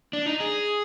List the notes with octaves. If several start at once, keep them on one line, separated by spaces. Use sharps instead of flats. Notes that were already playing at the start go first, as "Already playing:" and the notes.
D4
D#4
G#4